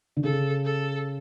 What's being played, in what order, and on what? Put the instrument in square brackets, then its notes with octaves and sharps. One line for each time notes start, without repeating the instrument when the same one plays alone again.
[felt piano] D3
[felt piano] C#3 [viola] A4
[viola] A4